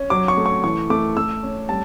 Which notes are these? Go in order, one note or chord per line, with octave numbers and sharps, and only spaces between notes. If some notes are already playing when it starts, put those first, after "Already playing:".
Already playing: C#4
F#3 D6
C#6
A3
C#6
E3 C#6
A3 D6
A3 E6
C#4
G3 A5